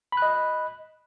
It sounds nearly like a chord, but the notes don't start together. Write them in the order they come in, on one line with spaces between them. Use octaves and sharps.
B5 F#6 D#5